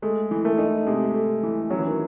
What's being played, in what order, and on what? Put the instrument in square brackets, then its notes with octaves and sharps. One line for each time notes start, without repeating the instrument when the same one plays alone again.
[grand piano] G#3 [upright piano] A3
[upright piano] E3
[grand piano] A3
[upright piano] D#4
[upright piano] C3 [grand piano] G#3
[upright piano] A3
E3
[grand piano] F#3 [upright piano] C#4
[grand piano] E3
D#3